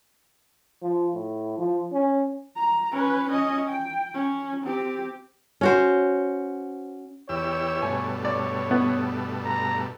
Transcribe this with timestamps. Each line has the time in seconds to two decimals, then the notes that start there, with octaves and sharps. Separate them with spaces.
0.83 F3
1.14 A2
1.58 F3
1.93 C#4
2.56 A#5
2.92 C#4 B4
3.29 C#4 D#5
3.69 G5
4.14 C#4
4.64 C4 G4
5.61 C#4 F#4 C5
7.29 E2 G4 C#5 E6
7.82 G2 B2 A3 G#5
8.25 C#5 D5
8.71 B3
9.44 A#5